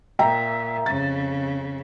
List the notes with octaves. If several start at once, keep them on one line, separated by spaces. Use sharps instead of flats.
A#2 E5 G5 A#5
F2 C#3 A6